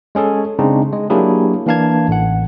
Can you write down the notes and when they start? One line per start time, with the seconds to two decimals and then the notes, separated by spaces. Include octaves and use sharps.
0.15 G#3 C#4 G#4 A4
0.59 C#3 G#3 C4 D4 D#4
0.93 G#3
1.10 F#3 A#3 D4 E4 G4 G#4
1.66 E3 A#3 D4 F5 A5 G#6
2.08 A1 F#5